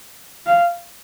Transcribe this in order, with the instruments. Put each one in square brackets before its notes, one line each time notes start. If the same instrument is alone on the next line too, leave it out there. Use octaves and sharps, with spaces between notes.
[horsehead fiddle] F5